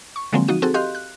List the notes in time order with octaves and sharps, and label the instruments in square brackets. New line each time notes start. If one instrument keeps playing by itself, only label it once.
[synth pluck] C#6
D3 F3 F#3 G#3 A#3 C4
F3 D#4 F#4 D#7
C4 F#4 G#4 A4
G4 D#5 F5 C6 F#6 G6
F#6